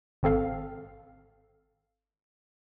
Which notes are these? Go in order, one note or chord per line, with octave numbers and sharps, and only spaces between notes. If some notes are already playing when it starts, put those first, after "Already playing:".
G#1 C4 A4 F5